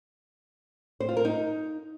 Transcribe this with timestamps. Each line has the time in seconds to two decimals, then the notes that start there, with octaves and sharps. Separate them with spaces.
1.00 C5
1.09 F4
1.17 A#4
1.25 D#4